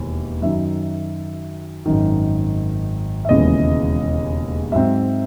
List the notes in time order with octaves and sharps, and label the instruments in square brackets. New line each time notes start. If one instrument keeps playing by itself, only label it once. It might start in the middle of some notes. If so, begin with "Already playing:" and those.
Already playing: [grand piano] E1 D#2 E3
F#2 D#3 F#3 E5
G#1 F#2 D#3
E5
E1 D#2 C#3 E3 G#3 D#5
G#2 F#3 C4 E5